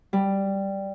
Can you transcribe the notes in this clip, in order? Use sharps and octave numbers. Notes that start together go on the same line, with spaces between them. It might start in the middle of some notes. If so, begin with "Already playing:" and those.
G3